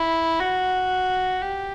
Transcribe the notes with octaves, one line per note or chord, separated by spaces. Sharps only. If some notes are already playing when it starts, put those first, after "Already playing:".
Already playing: E4
F#4
G4